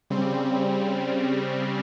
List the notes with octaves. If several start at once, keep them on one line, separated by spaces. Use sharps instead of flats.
C#3 G3 C4